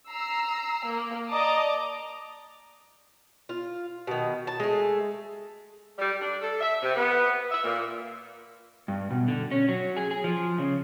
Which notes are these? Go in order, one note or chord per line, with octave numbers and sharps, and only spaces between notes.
A#5 E6 C7
A#3
D5 D#5 A5 A#5 D6 D#6
F4
B2 D#3
A5
G#3 A3
G3
D4
A4
E5
C3
B3
E5
A#2
G2
B2
D3
C#4
F#3
G#4
G#4
F3
C#3